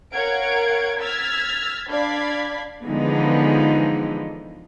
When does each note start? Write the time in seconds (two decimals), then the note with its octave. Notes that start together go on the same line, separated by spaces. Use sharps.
0.13 A#4 C#5 F5 F#5 G#6 D7
1.00 E6 F6 G#6 A6 B6
1.89 D4 D5 F5 B5 G#6 B6
2.84 D3 E3 F3 G#3 B3 D#4